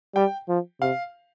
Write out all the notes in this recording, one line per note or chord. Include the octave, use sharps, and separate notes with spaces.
G3 G5
F3
C3 F5